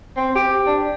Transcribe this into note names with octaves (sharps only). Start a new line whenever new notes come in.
C4
G4
D4